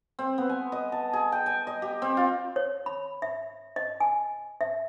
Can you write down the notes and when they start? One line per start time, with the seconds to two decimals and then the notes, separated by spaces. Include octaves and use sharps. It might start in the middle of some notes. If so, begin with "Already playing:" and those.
0.19 C4
0.38 B3
0.49 G#5
0.72 D#5
0.92 A5
1.13 G#4
1.32 G5
1.46 G#5
1.67 D#5
1.82 G4
2.02 C4
2.17 F4
2.56 C#5
2.86 B5
3.22 E5
3.76 D#5
4.00 G#5
4.61 E5